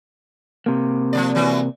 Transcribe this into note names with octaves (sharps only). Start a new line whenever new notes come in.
C3 A#3
F3 G3 D5
E3 F#3 F#4